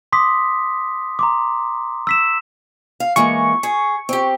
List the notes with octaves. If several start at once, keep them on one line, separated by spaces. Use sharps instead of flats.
C6 D6 D#6 B6
A#5 C6 D6
E6 B6 E7
F5
E3 G#3 A#3 C#6
G#4
C4 G4